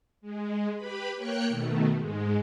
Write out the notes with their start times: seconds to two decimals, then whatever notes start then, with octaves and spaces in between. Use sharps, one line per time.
0.21 G#3
0.75 G4 B4 B5
1.16 A#3 C#5 G5 C#6 F#6 C#7
1.48 B2 D#3 A3
1.96 G#2 G#3